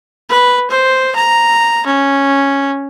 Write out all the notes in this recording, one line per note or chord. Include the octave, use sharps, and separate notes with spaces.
B4
C5
A#5
C#4